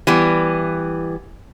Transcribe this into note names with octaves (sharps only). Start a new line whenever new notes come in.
E3 G3 B3